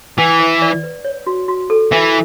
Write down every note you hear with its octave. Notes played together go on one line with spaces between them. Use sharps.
E3 F#5
B4
D5
B4
C#5
F#4
F#4
A4
E3 E5